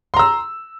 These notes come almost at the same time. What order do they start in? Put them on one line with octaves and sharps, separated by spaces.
C6 A#5 E6